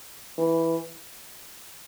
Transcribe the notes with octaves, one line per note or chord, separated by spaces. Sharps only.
E3